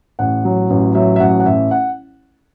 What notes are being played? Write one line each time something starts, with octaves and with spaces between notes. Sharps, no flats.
A1 F#5
F#3
A1
F#3 E5
E5
A1 F#5
F#5
A1 E5
F#5